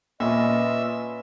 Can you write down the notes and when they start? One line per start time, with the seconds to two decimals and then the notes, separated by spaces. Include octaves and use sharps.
0.20 A#2 C#4 B4 D#5 E5